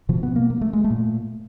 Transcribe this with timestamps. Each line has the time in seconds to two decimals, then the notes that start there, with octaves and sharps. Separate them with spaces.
0.09 B2 F3
0.23 B3
0.36 A#3
0.50 A#3
0.61 A3
0.73 G#3
0.84 A3
0.90 A#2